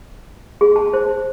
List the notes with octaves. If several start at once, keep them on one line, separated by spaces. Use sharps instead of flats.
G#4
A5
C5